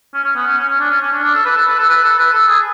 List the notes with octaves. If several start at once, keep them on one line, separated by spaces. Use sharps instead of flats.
C#4
C#4
B3
C#4
C#4
C#4
D4
C#4
C#4
D4
D4
A4
B4
A4
B4
A4
B4
A4
B4
A4
G#4